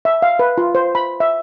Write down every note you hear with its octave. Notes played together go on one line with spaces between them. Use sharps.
E5
F5
B4
F4
C5
B5
E5